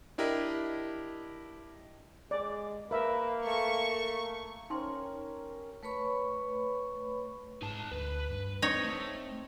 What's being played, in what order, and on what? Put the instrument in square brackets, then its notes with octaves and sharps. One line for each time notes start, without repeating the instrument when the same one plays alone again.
[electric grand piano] D4 E4 G4 A#4 D#5
[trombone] G#3 [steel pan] D5
[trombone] A#3 [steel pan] A#4 E5 [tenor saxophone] B4
[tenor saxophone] A3 [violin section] C#6
[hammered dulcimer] C#4 G4 A#4 [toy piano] D#4 A5 C6
[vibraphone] A3 B4 C#5 B5 C#6
[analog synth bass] G#2 [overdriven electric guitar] D#4 A5
[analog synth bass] D2 [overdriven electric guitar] B4
[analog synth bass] G2
[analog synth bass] C4 [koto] D#4 C#5
[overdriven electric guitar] A3